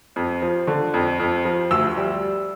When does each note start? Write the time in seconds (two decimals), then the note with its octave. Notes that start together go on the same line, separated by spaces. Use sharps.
0.16 F2
0.42 F3
0.67 D3
0.94 F2
1.20 F2
1.45 F3
1.71 D2 E6
1.97 G3